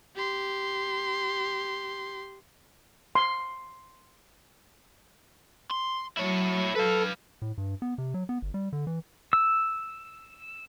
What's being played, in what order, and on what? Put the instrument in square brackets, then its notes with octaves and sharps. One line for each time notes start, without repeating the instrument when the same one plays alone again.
[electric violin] G4 C6
[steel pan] C6
[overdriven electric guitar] C6
[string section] F#3 [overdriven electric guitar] E4 C#5
[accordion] A4 [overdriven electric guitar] B4 F5
[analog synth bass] A2
G2
B3
C3
F#3
B3
G1
G3
D3
E3
[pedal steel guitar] E6